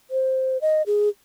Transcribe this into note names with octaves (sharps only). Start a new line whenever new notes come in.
C5
D#5
G#4